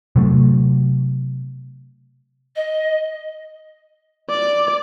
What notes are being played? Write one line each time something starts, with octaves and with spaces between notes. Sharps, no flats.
C3 F#3 A3
D#5
D5